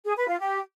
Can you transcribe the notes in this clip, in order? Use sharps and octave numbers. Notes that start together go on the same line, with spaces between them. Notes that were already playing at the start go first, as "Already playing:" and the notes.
G#4
B4
F4
G4